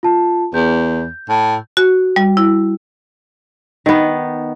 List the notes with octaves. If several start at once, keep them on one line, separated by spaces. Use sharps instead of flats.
F4 A5
E2 G6
A2
F#4
G3
E4
D#3 B3